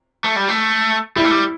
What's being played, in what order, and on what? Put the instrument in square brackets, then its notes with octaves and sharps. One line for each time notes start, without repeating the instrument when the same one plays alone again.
[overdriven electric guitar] A3
G3
A3
[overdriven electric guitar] G3 [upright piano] E4
[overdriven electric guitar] A3
G3